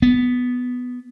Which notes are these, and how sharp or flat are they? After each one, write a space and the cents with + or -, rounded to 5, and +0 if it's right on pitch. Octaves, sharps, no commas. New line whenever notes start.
B3 +5